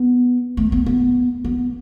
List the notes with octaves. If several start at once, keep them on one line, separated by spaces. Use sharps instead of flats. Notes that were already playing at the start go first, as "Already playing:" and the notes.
Already playing: B3
A3
B3
B3
B3